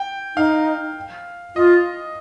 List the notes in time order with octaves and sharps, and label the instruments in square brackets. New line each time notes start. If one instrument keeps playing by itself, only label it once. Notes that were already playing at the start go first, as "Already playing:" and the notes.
Already playing: [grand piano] G5
[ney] D#4 [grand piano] F5
[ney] F4 [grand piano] D#5